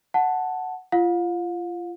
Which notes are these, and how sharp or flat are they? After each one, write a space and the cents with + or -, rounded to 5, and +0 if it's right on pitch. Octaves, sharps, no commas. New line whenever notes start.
F#5 +0 A5 +0
F4 -25 F5 +40